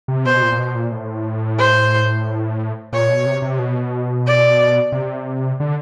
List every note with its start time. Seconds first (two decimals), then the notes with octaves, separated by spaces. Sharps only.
0.08 C3
0.26 B2 C5
0.42 A#2
0.52 A#2
0.58 B2
0.75 A#2
0.92 A2
1.58 C5
2.93 A#2 C#5
3.09 B2
3.26 C3
3.42 C3
3.59 B2
4.26 D5
4.92 C3
5.60 D3